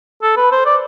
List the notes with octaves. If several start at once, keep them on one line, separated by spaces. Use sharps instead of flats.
A4
B4
C5
D5